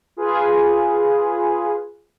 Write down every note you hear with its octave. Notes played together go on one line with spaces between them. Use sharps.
F4 G#4 B4